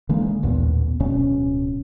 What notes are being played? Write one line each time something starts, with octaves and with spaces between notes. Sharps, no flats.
D3 E3 G#3 A#3
A1 D#2 A#2 B3
D1 B2 C#4